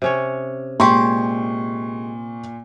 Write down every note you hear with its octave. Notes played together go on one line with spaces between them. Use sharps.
C3 C#4 C#5
A#2 G#3 G4 C6 C#6